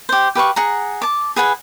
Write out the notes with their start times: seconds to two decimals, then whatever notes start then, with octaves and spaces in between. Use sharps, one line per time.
0.09 G4 C5
0.35 G4 B4 F5 C#6
0.56 G#4 F#5 A#5
1.02 A5 D6
1.36 G#4 B4 F#5 G#5